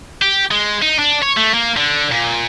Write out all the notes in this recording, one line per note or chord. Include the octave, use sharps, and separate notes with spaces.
G4
G#3
D#4
D4
C#5
A3
A#3
D3
A#2